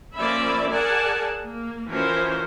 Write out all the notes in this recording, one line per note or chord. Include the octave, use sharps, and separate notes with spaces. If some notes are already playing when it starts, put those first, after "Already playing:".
F3 A#3 C#4 D5 E5 B5
G#4 A#4 D5 F#5 G#5 A5
A#3
E3 F3 C#4 F#4 A#4 C5